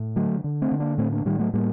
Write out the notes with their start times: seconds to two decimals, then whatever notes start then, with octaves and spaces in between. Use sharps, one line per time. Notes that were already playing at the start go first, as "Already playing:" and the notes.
Already playing: A2
0.16 D3 F#3 A3
0.44 D3
0.62 A3 C4
0.72 D3
0.80 A#3 D4
0.98 A2 A3 C4
1.12 A#3 D4
1.25 A2 D#3 G3
1.39 F#3 A3
1.54 A2 G3 A#3